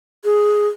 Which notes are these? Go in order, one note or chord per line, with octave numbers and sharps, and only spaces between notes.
G#4